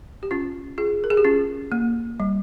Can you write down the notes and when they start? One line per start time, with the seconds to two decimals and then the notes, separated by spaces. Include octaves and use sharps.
0.23 G4
0.31 C#4 F4
0.78 F4 G#4
1.04 A#4
1.10 G#4
1.17 G4
1.25 C#4 F4
1.72 A#3
2.20 G3